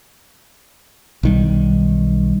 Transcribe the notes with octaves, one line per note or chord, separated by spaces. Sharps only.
B1 D#3 G3